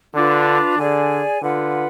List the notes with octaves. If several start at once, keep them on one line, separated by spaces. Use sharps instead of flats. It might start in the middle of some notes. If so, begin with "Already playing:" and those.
D3 D4 F4 B4
D3 G#4 D5 G#5
D3 F4 B4 F#5